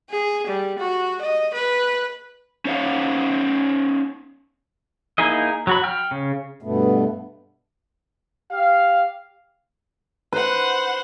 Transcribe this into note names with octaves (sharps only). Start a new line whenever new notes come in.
G#4
G3
F#4
D#5
B4
C#4 D#4 C5 C#5 F5 F#5
A#3 D#4 E4 G#4 D#5
F#3 F#4 B5
G5 F6
C#3
G2 B2 A3 B3
G4 F5
B4 C5 F#5